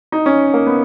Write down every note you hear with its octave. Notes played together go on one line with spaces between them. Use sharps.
D#4
C#4
A#3
B3